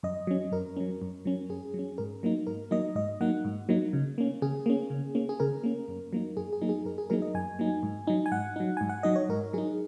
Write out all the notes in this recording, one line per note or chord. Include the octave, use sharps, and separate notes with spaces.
F#2 D#5
F#3 C#4
F#2 A#4
F#3 C#4
F#2
F#3 C#4
F#2 G#4
F#3
C#4
G#2 A#4
F#3 A#3 D#4
G#2 A#4
F#3 A#3 D#4 D#5
G#2 D#5
F#3 A#3 D#4 F#5
G#2
F#3 A#3 D#4
C#3
A#3 C#4
C#3 G#4
A#3 C#4
C#3
A#3 C#4
G#4
C#3 A#4
A#3 C#4
F#2
F#3 A#3 D#4
F#2 G#4
G#4
F#3 A#3 D#4
G#4
F#2 A#4
G#4
F#3 A#3 D#4 A#4
D#5
F#2 G#5
F#3 A#3 D#4
G#2
F#3 D#4
G#5
G#2 F#5
F#3 D#4
G#2 G#5
F#5
F#3 D#4 D#5
C#5
G#2 A#4
F#3 D#4 G#4